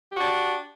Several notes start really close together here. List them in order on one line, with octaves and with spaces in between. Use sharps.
G4 F#4 D4